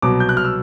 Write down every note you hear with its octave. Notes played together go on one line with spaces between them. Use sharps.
C2 B2 F#3 D6
G6
F#6
F6
E6